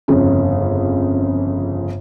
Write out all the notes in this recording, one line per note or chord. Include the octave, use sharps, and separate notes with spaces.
G1 F2 C#3